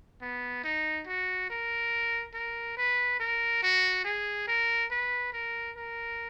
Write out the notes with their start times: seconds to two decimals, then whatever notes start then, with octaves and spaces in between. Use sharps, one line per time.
0.21 B3
0.64 D#4
1.07 F#4
1.50 A#4
2.34 A#4
2.78 B4
3.20 A#4
3.63 F#4
4.05 G#4
4.48 A#4
4.91 B4
5.33 A#4
5.77 A#4